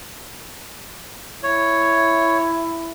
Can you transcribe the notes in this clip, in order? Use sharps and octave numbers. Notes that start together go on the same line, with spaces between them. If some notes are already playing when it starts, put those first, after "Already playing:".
E4 C#5